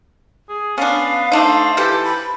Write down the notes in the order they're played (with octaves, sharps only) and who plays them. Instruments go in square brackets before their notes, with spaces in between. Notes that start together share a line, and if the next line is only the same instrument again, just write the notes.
[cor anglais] G#4
[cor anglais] B3 [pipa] C#4 D4 [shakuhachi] F5
[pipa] A3 D4 D#4 [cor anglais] C5
[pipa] E3 A4 [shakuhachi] G4
[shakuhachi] B5